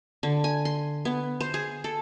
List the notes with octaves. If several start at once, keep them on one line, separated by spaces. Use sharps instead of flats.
D3
G#5
C6
B3
C5
G#4
A4